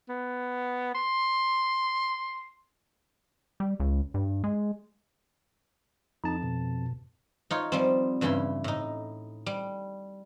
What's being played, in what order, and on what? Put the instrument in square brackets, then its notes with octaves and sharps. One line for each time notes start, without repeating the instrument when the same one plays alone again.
[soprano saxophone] B3
C6
[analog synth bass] G3
C#2
G2
G#3
[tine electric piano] F2 A5 [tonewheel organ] D#4
[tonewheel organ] B2
[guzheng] D#4 F4 C#5
F3 G3 C4
E2 G2 C#3 E4 C6
A2 D#4
G3